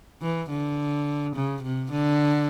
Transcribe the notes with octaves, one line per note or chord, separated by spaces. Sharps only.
E3
D3
C#3
C3
D3